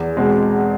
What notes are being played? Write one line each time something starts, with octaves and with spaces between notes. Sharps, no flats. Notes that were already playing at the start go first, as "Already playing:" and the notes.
Already playing: E2
B2 G#3 C4